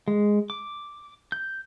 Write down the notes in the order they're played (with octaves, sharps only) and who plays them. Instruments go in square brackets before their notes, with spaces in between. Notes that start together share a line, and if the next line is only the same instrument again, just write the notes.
[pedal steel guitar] G#3
D6
G6